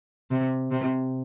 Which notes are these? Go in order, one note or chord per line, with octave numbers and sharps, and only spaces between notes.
C3
C3